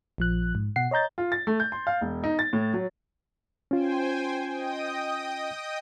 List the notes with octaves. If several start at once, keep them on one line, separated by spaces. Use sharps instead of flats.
A#1 F3 F#6
G#2
B2 F#5 C7
C#5 D#5 A#5 G6 A6
F4
A6
A3
G6
C6
F5
E1
D#4
A6
A2
F#3
C#4 F4 C5 G5 G#5
D#5 G5 D#6